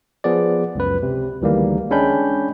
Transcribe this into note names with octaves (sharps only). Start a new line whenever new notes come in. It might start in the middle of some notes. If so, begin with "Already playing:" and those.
F3 B3 G#4 D5
C#2 F#2 B4
C3
D2 D#3 E3 G3 G#3 A#3
G#3 C#4 D4 G5 B5 G6